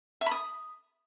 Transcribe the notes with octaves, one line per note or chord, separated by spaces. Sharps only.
E5
B5
D#6